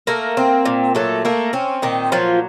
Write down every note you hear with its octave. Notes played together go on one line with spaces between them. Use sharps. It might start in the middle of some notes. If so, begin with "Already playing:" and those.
A3 A#3 A#4
C4
A#2
F#3 A3 A4
A3 A#3 A#4
C4 C#4
A#2 D#3 D#4
F3 F#3 F4